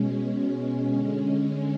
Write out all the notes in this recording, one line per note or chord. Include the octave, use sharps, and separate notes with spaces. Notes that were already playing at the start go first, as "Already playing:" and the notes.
Already playing: B2 G#3 C#4
D3 G#3 C#4